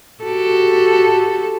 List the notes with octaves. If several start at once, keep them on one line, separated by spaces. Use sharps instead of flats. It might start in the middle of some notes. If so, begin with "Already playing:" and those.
F#4 G4 A4